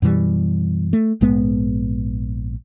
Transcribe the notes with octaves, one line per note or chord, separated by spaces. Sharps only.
F#2 B2 E3 G3
A3
A#1 G#2 G#3 B3